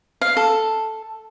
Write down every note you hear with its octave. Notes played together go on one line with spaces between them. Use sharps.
F5
A4